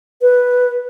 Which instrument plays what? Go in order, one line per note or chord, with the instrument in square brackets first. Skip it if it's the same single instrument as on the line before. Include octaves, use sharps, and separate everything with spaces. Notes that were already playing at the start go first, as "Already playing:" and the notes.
[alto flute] B4